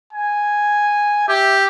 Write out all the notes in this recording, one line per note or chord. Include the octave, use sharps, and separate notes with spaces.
G#5
G4 E5